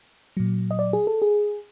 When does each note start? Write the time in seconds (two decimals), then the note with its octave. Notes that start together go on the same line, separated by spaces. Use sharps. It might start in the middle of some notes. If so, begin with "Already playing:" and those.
0.37 A#2 F#3
0.71 D#5
0.79 D5
0.93 G#4
1.07 A4
1.22 G#4